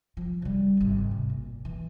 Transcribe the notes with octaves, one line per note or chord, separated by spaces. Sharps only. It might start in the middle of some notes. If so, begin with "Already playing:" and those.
F3
C#3 G3
D1 G#1
C3
A#2
E3